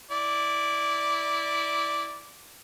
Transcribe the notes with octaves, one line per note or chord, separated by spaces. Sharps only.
E4 D5